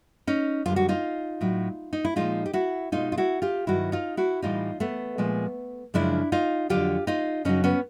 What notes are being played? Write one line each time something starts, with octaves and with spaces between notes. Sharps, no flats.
C#4 D#4
F#2 D3 G3 F4
F#4
D#4 F4
A2 F#3
D#4
E4
A#2 F3 G#3 D#4 F4
G4
E4 F#4
B2 G#3 D#4 F4
F4
E4 F#4
F4 G4
G2 D#3 F#3 E4 F#4
D#4 F4
E4 F#4
A2 E3 G3 D#4 F4
A3 B3
A#2 F3 G#3
F#2 C#3 F3 G#3 D4 E4
D#4 F4
F2 D3 F#3 F4 G4
D#4 F4
F#2 C#3 F#3 C#4 D#4
B3 C#4